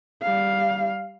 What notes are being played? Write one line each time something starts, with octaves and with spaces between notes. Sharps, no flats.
G3 F5